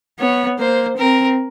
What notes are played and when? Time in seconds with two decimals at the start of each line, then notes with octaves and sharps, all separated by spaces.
0.19 B3 C#5
0.59 A#3 C5
0.98 C4 A#4